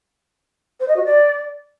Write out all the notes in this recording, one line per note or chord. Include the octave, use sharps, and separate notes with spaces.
C5
D#5
F#4
D5